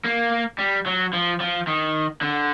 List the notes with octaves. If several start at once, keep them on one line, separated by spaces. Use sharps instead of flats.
A#3
G3
F#3
F3
F3
D#3
D3